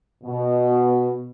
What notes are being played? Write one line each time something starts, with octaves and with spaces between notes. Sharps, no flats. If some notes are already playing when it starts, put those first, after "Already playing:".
B2